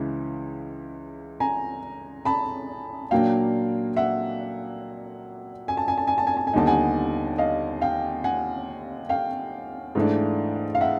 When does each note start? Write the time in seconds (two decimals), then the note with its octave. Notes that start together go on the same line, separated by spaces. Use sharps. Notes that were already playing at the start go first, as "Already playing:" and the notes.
Already playing: C#2 C#3 E3 G#3
1.40 G#5 A#5
2.25 A5 B5
3.11 A#2 F#3 A#3 D4 F5 G5
3.96 E5 F#5
5.68 G#5
5.77 A5
5.88 G#5
5.98 A5
6.07 G#5
6.18 A5
6.27 G#5
6.37 A5
6.47 G#5
6.53 D#2 D3 G3 B3 D#4 A5
6.67 F#5 G#5
7.38 D#5 F5
7.81 F5 G5
8.24 F#5 G#5
9.09 F5 G5
9.95 G#2 E3 A3 D4
10.75 F5
10.81 E5 F#5